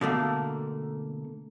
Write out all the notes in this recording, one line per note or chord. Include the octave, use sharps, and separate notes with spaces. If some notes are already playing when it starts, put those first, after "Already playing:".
B2 D3 A3 A#3